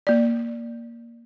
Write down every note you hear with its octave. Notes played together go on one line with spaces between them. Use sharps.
A#3 D5